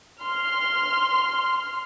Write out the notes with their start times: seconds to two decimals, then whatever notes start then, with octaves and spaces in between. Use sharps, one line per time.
0.21 C6 F6